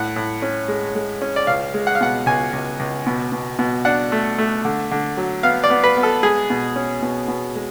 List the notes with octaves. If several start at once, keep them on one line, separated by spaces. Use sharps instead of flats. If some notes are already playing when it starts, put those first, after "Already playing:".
Already playing: A2 F#5
A2
C#4
G#3
G#3
C#4
D5
C#2 F5
G#3
F#5
F5
B2 F#5
C#2 G#5
C#2
C#2
B2
B2
B2
D4 F#5
A3
A3
D3
D3
F#3
B3 F5
D5
B3
B4
B3
A4
G#3 G#4
B2
C#4
B2
B2
G#3